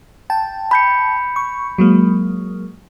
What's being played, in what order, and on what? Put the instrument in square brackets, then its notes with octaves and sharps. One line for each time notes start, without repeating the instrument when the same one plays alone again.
[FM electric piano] G5 A5
[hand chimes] B5 G6 C#7
[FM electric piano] C#6
F#3 G#3 A#3